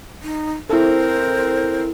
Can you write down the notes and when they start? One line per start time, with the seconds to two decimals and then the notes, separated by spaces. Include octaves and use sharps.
0.23 D#4
0.70 C4 E4 A4 A#4 C5